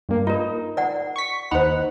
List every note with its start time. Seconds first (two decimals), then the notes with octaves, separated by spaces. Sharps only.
0.09 G2 A#3
0.27 D#4 F4 A#4
0.77 D5 F#5
1.16 C#6 B6
1.51 D#2 D#4 C5 F#5 B5